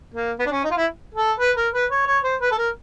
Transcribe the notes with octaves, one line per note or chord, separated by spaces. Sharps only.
A#3
B3
D4
C#4
D#4
F4
E4
A4
B4
A#4
B4
C#5
C#5
C5
B4
A4
A#4